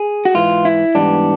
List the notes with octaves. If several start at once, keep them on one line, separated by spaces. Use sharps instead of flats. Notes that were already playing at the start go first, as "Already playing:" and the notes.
Already playing: G#4
F#4
G#2 E3 F4
E4
G#2 E3 G3 B3 D4